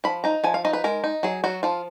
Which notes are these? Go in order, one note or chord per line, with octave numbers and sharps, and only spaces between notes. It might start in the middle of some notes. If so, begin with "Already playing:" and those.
F3 B5
D#4 A#5
F3 G#5
F5
D#4 D#5
B4
G#3 A#4
D#4
F#3 G#4
F#3 F#4
F3 F4